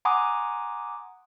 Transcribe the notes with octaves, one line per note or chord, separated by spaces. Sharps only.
F#5 G#5 A#5 C6 D6 D#6